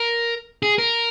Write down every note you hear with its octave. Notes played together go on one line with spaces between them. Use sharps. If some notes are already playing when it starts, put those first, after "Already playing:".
Already playing: A#4
G#4
A#4